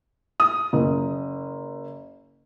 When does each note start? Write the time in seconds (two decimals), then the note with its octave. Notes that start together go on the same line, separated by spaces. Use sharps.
0.40 D#6
0.73 F#1